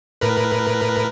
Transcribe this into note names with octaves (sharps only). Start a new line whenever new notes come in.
A2 A#4 B4